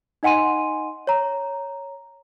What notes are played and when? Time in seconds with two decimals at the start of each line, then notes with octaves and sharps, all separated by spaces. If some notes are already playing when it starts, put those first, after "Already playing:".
0.23 D#4 D#5 F#5 G#5 C6 D#7
1.07 C#5 A#5